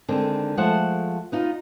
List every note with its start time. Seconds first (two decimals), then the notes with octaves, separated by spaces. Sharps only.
0.08 D3 D#3 G#3 C4
0.57 F3 G#3 A3 C5 F#5
1.32 B3 D#4 F4